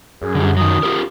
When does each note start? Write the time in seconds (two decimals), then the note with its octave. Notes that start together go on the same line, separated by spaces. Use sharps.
0.22 F#2 G#4
0.35 D3 G3
0.57 D#3 F#3 D#6
0.83 F4 G4 A#4